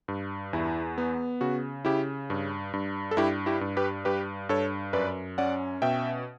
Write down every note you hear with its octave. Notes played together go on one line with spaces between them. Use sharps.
G2
E2 E4
B3
C#3 F#4
C#3 E4 G4
G2
G2
A4
G2 E4 G4
E4 G4
G2
G4 B4
G2 G4 B4
G2 A4 C#5
F#2 B4 D5
C#4 D5 F#5
B2 E5 G5